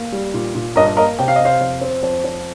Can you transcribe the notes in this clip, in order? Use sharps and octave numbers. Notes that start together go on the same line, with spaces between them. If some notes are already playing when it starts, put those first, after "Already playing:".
Already playing: A#3
G3
A#2
A#2
G2 A#4 D#5
A#3 A#4 D#5
C3 G5
F5
D#5
C3 C5 F5
F2
C4
F2
F2